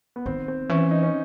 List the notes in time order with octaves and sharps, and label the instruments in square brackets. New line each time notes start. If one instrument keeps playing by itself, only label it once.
[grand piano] B3
[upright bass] D#3 [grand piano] C4
[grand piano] C4
[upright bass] E3 [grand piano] C#4
[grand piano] D#4
C#4